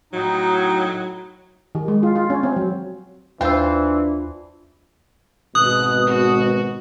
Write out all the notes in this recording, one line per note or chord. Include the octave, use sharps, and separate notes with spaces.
A2 F#3 D#4
D#3
G#3
F4
F4
C#4
C4
F#3
D#2 E3 D4 F4 C5 E6
G#1 G#2 B2 D#6 F#6
F#4